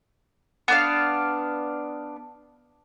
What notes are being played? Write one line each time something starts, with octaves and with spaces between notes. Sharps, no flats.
B3 D4 F5